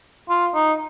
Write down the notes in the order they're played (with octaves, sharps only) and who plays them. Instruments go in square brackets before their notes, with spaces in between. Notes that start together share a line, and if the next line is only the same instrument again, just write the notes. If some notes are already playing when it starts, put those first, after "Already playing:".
[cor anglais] F4
D#4